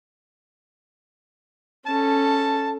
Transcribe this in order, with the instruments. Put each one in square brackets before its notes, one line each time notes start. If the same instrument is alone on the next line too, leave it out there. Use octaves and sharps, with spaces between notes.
[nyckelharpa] C#4 A4 [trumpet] A5